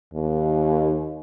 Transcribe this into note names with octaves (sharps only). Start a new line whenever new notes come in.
D#2